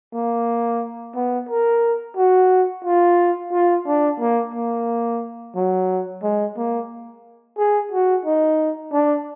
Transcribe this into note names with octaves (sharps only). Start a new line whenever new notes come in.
A#3
B3
A#4
F#4
F4
F4
D4
A#3
A#3
F#3
G#3
A#3
G#4
F#4
D#4
D4